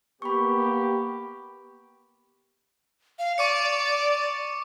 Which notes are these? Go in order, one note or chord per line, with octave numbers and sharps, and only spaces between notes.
A#3 B3 G4 B5 C#6
F5
D5 C#6 D6 C#7